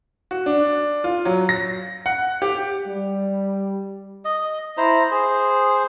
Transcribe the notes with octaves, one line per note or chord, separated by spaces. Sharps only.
F#4
D4
F4
F#3
A#6
F#5
G4
G3
D#5
E4 C5 A#5
G#4 C5